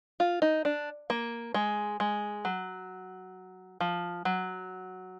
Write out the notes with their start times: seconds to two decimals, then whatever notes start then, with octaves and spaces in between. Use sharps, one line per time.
0.20 F4
0.42 D#4
0.65 D4
1.10 A#3
1.54 G#3
2.00 G#3
2.45 F#3
3.80 F3
4.25 F#3